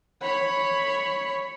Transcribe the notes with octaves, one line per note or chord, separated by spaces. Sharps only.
C#5 B5